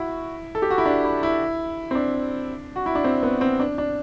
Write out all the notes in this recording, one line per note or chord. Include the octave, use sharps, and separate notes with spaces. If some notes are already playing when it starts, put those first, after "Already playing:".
Already playing: E4 F#4
A4
G4
F#4
E4
D4
E4
E4
C4
D4
F#4
E4
D4
C4
B3
C4
D4
D4